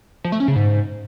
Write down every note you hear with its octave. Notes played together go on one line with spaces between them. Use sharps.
F3
A3
C#4
C#3
G#2